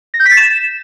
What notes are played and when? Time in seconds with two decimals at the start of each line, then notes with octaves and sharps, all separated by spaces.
0.14 A#6
0.20 G6
0.25 B6
0.31 A6
0.37 E7